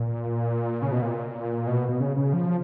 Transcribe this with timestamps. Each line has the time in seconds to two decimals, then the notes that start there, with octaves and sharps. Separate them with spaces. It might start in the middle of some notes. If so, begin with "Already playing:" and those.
Already playing: A#2
0.82 C#3
0.92 B2
1.02 A#2
1.67 B2
1.89 B2
2.00 C#3
2.16 C#3
2.33 F3